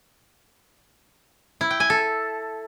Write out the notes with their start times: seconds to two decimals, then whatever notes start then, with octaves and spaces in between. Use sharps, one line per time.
1.61 E4
1.70 G5
1.80 G#5
1.90 A4